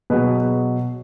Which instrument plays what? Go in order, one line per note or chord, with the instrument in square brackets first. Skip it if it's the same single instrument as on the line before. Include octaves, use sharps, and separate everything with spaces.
[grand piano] B2 F#3 G#4 B4